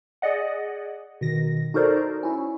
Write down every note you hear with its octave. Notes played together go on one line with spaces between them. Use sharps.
G#4 D5 D#5 F#5
B2 D#3 A#6
D#4 F#4 A4 A#4 C5 D5
C#4 E4